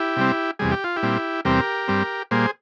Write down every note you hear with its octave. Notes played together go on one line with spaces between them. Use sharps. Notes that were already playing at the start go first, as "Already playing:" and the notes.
Already playing: E4 G4
C3 G3 C4
E2 C3 G3 G#4
G4
F4
E4 G4
A#2 G3 C4
E2 C3 G3 C4 G4 A#4
G2 G3 C4
A#2 G3 A#3 G#4 C5